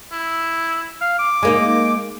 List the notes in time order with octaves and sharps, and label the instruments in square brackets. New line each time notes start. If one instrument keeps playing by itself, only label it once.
[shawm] E4
F5
D6
[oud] G#3 A#3 D#4